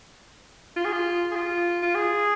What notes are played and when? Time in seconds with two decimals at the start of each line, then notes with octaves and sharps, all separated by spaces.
0.76 F4
0.85 G#4
0.92 F4
1.31 G#4
1.36 F4
1.83 F4
1.95 G#4